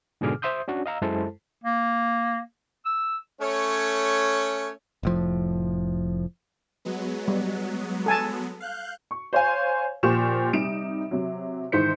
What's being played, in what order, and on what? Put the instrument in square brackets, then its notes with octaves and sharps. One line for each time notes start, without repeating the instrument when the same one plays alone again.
[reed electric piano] G#2 B2 D3 G#4 D6 F6
C5 E5 C6 D#6 G6
C#4 D4 F#4
D#5 F5 A#5 E6
F#2 G#3 E4 A4 C5 A5
[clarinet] A#3
E6
[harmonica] A3 C#4 C#5
[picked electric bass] F1 A2 F3
[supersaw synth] F#3 G#3 B3
[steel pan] G3
A4 G#5 A5
[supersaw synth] F5 F#6 G6
[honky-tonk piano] C#6
C5 C#5 F5 G#5
A#2 F3 G4 C5 C#6 E7
C3 G3 D#4 D7 E7
C3 F#3
G#2 D#3 E3 C5 B6 C#7